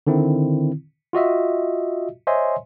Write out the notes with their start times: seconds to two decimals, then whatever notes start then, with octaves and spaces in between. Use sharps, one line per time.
0.07 D3 D#3 C4 E4
1.13 F4 F#4 D#5 E5
2.27 C5 C#5 D#5 E5 G#5 C6